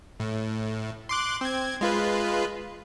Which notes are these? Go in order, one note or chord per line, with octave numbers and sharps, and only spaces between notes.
A2
C6 D6 F#6
C4 G#6
G#3 F4 B4